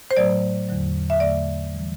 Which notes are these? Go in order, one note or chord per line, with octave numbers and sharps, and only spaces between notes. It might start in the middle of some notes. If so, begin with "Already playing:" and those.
C5
A2 F#3 A3 D5
E2 D3 F#3
E5
E2 D3 A3 D5
E3 G3